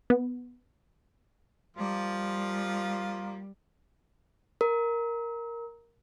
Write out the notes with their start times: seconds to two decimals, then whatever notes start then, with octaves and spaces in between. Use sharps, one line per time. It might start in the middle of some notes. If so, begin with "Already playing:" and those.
0.10 B3
1.77 F3 G3 A#3 F4
4.61 A#4